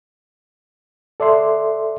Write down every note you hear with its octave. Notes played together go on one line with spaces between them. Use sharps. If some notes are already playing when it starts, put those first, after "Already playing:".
A4 D5 E5 C6